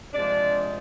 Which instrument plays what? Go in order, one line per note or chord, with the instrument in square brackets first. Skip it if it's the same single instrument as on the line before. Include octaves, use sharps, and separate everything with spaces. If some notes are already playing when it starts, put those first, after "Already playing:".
[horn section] C3 F3 G#3 D4 D5